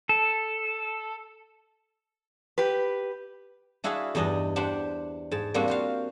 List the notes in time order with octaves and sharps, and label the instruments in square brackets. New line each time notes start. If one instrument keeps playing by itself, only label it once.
[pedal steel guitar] A4
[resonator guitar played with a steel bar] G4 B4
[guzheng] D4 E4 F#4 G#4 E5 F5
E2 G2 D4 D#4 D#5
D4 G4 C5 F#5
G#2 A5
G3 A#3 C4 D4 F#4
F#4 C5 F5